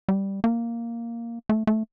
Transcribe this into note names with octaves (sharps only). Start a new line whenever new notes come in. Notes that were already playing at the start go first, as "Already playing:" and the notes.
G3
A#3
A3
A3